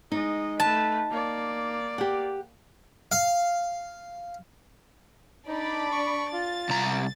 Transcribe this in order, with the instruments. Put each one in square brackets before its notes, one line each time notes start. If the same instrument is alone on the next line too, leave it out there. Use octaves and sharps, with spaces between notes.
[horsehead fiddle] G#3 D#5 [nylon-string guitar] D#4
[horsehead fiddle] A3 B4 [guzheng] A5
[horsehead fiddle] A#3 D5
[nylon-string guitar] G4 F#5
[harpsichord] F5
[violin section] D4 D5 B5 [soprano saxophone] D#4
[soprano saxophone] C#6
[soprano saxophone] F4 [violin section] A6
[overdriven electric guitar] C2 A#5